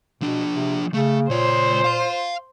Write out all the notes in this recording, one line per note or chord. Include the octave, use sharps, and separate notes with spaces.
B2 F3 D4
C3
C#3 A3
C#2 A#2 C5 C#5
F5 C6